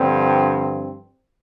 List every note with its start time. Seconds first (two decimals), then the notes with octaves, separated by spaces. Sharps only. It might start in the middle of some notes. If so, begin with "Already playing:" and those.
Already playing: G2 D3 F3 C4